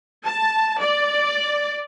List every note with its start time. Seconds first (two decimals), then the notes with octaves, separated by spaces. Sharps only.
0.24 A5
0.79 D5